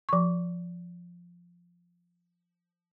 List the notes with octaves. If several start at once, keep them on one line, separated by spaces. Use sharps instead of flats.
F3 C#6